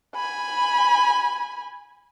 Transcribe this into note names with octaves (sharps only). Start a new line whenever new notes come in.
G#5 B5